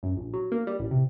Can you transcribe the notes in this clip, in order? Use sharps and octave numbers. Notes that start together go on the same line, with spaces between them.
F#2
A#1
F#3
A#3
G3
A1
C3